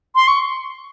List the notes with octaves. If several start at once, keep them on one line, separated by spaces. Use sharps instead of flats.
C6
C#6